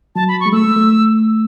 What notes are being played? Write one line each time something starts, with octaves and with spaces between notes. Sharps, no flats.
F#3 A5
B5
C#6
G#3
A3 E6
A3
A3